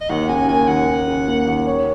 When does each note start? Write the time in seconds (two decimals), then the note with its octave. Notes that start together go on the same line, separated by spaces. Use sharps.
0.01 D#5
0.09 D#2 F#5
0.29 C#3 G#5
0.49 A#3 G#5
0.68 D#2 F#5
0.88 D#2
1.07 C#3
1.28 A#3
1.47 D#2
1.67 C#5